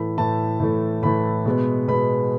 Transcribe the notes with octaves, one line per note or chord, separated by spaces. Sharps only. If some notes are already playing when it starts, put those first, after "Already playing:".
Already playing: A2 E3 A3 B5
A2 E3 A3 A5
A2 E3 A3
A2 E3 A3 B5
B2 G#3 B3
B2 G#3 B3 B5